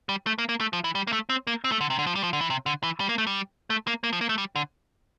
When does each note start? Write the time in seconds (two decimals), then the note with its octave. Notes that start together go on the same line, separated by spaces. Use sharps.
0.09 G3
0.27 A3
0.38 A#3
0.49 A#3
0.61 A3
0.73 F3
0.84 E3
0.95 G3
1.07 A#3
1.13 A3
1.29 C4
1.47 A#3
1.64 C4
1.72 A3
1.81 D3
1.90 C3
1.99 D3
2.07 F3
2.15 G3
2.23 F3
2.33 D3
2.41 E3
2.50 C3
2.66 D3
2.83 E3
3.00 G3
3.09 A#3
3.18 A3
3.27 G3
3.70 A3
3.87 A#3
4.04 A#3
4.13 F3
4.21 A#3
4.29 A3
4.38 G3
4.56 D3